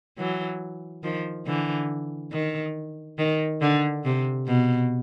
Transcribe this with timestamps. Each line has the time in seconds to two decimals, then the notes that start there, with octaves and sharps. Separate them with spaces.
0.18 E3 F#3
1.04 D#3 F3
1.47 D3 E3
2.33 D#3
3.18 D#3
3.61 D3
4.05 C3
4.47 B2